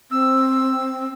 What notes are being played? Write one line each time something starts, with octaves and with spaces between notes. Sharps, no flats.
C4 E6